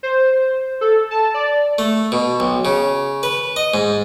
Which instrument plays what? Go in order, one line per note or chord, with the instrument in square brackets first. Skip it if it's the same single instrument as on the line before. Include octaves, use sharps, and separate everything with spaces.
[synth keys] C5
A4
A5
D5
[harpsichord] A3
B2
B1
C#3
B4
D#5
G#2